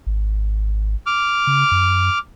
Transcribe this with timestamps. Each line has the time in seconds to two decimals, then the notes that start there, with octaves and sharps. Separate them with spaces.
0.07 G#1
1.06 D6 F6
1.47 C#3
1.71 F#2